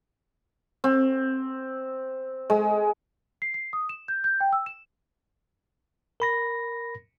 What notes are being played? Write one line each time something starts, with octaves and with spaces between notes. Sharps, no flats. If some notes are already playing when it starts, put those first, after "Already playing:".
C4
G#3
C7
C7
D#6
E7
G6
G6
G5
E6
E7
A#4 B5 A#6